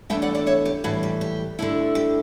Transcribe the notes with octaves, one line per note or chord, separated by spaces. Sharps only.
E2 D3 A3 E4 E5 G5
D5 F#5
D5 F#5
C#5 E5
G4
A2 E3 G3 F#4
G4
G4
D3 A3 E4
G4